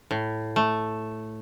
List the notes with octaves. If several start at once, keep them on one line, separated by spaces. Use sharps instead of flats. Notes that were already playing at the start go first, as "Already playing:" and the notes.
A2
A3